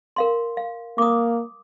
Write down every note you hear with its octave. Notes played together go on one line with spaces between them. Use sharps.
A#4 F5 C6
F5
A#3 D6 D#6